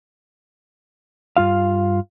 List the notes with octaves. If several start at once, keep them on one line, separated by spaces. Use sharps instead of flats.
G2 F4 F5